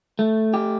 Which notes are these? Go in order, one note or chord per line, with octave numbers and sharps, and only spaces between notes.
A3
G4